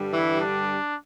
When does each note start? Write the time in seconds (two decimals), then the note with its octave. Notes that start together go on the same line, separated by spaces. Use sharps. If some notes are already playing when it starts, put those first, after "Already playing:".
Already playing: G2 D3 G3
0.12 E3 E4
0.41 D4